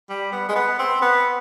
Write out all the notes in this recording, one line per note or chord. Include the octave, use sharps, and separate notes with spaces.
G3
B3
G#3
B3
C4
B3